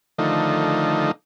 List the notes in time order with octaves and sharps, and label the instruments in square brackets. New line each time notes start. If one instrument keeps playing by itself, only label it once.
[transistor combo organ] D3 D#3 F3 A3 D#4